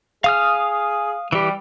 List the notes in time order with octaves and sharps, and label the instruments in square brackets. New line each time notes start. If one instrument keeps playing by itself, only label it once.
[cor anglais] G#4 [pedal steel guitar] F5 D#6 F6
[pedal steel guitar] E3 G4 [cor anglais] G3